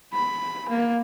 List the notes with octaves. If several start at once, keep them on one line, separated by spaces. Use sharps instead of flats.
B5
A#3